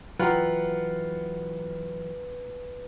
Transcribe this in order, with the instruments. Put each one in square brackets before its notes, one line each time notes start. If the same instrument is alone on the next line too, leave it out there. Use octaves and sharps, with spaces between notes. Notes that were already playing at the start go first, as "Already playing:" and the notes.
[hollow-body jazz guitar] E3 F#3 [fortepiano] F4 [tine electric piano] B4 [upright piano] F#5 G5 A#5